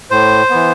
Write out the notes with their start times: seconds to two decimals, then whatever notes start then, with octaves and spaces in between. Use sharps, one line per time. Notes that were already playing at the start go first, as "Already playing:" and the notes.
0.11 A2 C5
0.50 E3 B3